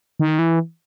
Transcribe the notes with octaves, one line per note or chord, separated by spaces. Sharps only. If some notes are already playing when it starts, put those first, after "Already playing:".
D#3
E3